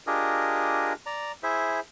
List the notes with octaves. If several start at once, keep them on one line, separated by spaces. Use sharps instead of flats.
D4 F4 G4 G#4 A#4 D#5
D5 A#5
E4 G#4 C5 E5